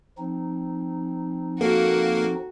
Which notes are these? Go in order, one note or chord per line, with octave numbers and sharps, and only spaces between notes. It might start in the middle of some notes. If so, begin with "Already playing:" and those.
F3 C4 D#4
A#3 F#4 A4